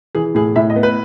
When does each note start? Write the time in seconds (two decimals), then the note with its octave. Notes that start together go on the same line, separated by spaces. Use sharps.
0.15 E3 G#4
0.35 A2 G#4
0.56 A2 E5
0.70 D#5
0.76 B3
0.83 B4